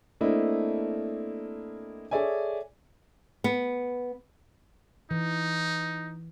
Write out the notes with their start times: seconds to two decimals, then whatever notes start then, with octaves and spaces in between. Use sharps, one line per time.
0.21 A3 A#3 C4 D4 E4 D#5
2.11 G#4 A4 C#5 D5 E5 G#5
3.44 B3
5.11 E3 D#4